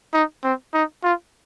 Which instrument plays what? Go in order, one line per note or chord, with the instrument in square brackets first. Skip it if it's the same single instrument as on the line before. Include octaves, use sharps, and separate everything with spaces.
[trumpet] D#4
C4
D#4
F4